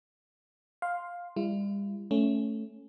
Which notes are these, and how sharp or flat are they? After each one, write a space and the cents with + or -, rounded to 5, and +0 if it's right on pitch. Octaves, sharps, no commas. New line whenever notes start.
F5 +10 C6 +0
G3 +40 E4 +45
A3 +0 C#4 +0